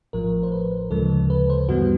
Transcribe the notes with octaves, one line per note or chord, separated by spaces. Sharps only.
A1 A2 F3 A#4
C5
B4
D2 C#3 F3 G#3 A4
B4
C5
G2 E3 G3 B3 F#4